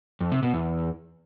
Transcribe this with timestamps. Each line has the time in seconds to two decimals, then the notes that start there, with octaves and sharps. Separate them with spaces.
0.21 F2
0.32 C3
0.43 B2
0.54 E2